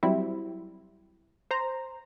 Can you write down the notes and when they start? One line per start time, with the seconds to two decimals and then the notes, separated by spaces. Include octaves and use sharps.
0.03 F#3 G3 C4 E4
1.51 C5 A#5